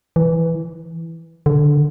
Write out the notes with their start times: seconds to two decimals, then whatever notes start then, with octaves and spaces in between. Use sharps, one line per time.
0.16 E3
1.46 D3